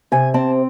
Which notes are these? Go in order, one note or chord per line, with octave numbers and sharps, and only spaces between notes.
C3 G#5
C4 A5